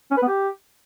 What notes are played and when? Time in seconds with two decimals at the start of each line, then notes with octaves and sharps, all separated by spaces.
0.11 C#4
0.17 B4
0.22 B3
0.28 G4